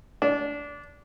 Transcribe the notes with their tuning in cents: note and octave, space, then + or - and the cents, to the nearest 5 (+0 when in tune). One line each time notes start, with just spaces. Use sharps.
D4 -20